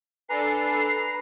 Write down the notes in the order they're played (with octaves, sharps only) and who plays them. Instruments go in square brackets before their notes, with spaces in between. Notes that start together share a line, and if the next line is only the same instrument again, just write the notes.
[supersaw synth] D4 A4 [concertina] B4 A#5 [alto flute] G#5 [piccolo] C7